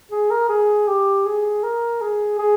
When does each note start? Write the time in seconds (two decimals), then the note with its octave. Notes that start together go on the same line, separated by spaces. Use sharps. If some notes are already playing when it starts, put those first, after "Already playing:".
0.11 G#4
0.30 A#4
0.49 G#4
0.87 G4
1.25 G#4
1.63 A#4
2.01 G#4
2.39 G#4